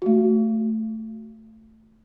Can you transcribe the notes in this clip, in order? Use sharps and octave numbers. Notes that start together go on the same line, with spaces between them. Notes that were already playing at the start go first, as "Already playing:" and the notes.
A3 F#4